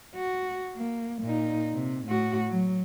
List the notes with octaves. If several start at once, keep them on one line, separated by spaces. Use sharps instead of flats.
F#4
A#3
A#2 D#4
C3
A2 F#4
F#3